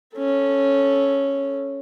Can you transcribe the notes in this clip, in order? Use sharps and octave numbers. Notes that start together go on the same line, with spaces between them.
C#4 A4